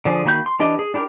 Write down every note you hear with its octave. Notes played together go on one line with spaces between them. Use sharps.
D3 F3 G#4
D#3 A#3 F#4 B5 G6
C6
E3 D4 G4 D#5
G#4
D4 E4 G4 G#4 A#4